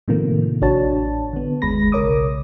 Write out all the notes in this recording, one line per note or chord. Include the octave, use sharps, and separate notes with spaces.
A2 C3 D#3 F3 A3 A#3
A1 D4 F#4 C#5 A5
D3 B3
G1 D#2 G#3 B5 A#6
B1 C#3 A#4 C#5 D6 D#6